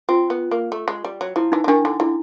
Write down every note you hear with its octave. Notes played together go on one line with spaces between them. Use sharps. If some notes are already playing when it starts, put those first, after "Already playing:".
C4 F4
B3
A#3
A3
G#3
G3
F#3
F3 E4
E3 D#4
E3
D#3 D4
D3 D#4
D3 E4